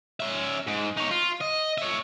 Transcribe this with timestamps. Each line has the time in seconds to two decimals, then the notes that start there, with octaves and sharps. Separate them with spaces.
0.20 C#4 E5
0.67 G#2
0.97 D#4 C#5
1.11 F4
1.41 D#5
1.78 C#5 E5